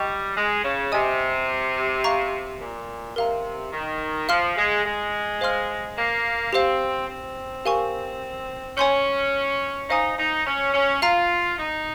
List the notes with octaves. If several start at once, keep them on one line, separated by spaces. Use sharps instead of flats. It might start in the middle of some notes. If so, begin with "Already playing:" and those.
Already playing: G3 D#5 G5 C#6
G#3
C#3
C3 D#5 G#5 D#6
F5 A#5 C#6
A#2
C3 A#4 F5 A#5
D#3
F3 F5 C6 F6
G#3
G#3
C5 F5 C6 F6
A#3
C4 G4 C5 F5
C4
G4 A#4 F5 G#5 C#6
C#4 C#5 G#5 C6 G6
D#4 C5 F5 G#5 D#6
D#4
C#4
C#4
F4 F5 A#5 F6
D#4